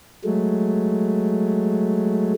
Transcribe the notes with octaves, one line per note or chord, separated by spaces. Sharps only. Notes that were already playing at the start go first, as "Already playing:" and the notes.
F#3 G#3 A3